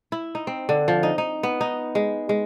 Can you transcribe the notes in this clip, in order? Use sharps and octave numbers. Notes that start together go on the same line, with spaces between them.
E4
D#4
C4
D3
F3
D#4
D#4
B3
D#4
G#3
G#3